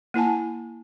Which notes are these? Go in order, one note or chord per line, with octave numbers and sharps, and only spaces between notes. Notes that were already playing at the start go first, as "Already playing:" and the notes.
A#3 E4 G#5 A5